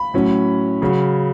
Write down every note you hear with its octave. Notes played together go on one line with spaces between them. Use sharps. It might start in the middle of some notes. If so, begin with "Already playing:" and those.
Already playing: B5
A2 F#3 C#4
C#3 F#3 C#4